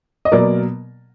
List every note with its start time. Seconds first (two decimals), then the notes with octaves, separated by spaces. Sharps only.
0.25 D#5
0.32 B2 F#3 A#3 A#4 D5